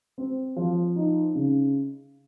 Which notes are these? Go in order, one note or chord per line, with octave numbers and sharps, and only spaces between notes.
C4
F3
D#4
C#3